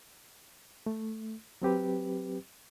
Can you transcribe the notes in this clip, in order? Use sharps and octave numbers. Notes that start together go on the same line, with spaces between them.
A3
F#3 C4 G4 B4